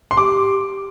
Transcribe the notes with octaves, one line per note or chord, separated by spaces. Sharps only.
C6
G4 D6